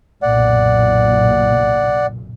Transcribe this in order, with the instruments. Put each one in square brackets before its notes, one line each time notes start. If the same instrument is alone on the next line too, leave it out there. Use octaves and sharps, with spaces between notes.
[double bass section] F#1 B1 A#2 [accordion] D5 F#5